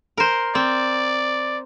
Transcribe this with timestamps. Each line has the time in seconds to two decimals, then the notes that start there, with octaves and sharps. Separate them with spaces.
0.17 A#4 C5
0.55 C4 D5